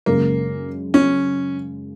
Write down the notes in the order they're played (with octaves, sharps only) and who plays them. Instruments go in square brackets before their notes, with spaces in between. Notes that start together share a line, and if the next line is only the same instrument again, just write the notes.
[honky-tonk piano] F#2 C#3 G#3 [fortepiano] A#3
[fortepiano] C#4